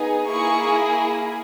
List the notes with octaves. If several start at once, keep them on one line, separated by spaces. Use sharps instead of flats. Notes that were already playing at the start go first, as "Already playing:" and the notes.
Already playing: B3 D#4 G#4
A#3 E4 G#4 C#6